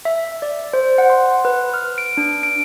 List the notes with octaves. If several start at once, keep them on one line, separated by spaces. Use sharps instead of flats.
E5
D5
C5
F#5
C6
B4
F6
D7
D4
D7